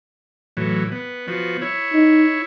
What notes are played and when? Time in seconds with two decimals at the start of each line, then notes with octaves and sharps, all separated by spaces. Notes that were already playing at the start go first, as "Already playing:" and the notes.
0.57 A2 E3 F#3
0.92 B3
1.28 F3 B3 F#4
1.62 E4 C#5
1.93 D#4